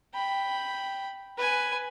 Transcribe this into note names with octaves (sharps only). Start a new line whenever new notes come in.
G5 B5
B4 G#5